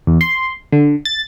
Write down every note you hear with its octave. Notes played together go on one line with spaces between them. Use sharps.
E2
C6
D3
A6